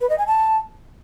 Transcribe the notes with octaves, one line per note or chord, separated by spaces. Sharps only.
B4
D#5
G#5
A5